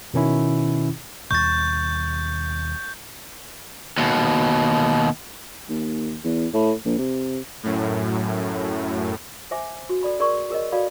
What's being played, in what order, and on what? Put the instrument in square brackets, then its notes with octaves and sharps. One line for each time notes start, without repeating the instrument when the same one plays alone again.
[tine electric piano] B2 D#3 C#4 E4
[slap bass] D#2 B2 G3 [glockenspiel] C#6 A6 [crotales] G6
[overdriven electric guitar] D#2 B2
[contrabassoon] D#2
E2
A2
A#1
C3
[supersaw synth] F#2 A2
[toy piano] C5 E5 G#5 D6
F#4
A4 D5 B5
G#4 A#4 D5 C6 C#6
G#4 A#4 C#5 D#5
F#4 A4 D5 F5 B5